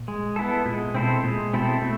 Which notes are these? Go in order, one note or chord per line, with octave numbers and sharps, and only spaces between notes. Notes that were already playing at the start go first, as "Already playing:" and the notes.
Already playing: A#2
G#3
B3 E4 A4
A#2 G#3
B2 C4 E4 A4 C5
A#2 G#3
B2 C4 E4 A4 C5
B2 A3